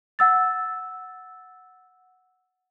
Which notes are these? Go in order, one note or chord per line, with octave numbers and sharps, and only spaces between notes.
F#5 E6 A6